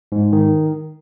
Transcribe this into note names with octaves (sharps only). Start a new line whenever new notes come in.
G#2
D#3